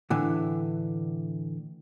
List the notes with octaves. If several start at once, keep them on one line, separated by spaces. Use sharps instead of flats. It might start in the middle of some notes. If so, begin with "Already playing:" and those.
A2 D3 E3